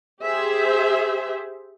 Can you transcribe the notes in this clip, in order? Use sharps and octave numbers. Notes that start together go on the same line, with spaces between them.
G4 G#4 C5 E5